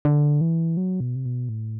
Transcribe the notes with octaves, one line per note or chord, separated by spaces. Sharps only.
D3
E3
F#3
B2
C3
B2
A2